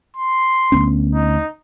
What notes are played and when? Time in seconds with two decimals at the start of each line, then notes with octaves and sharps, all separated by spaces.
0.17 C6
0.72 D2 B3 C#4
1.14 D#4